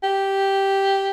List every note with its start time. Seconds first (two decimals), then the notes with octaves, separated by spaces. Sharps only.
0.03 G4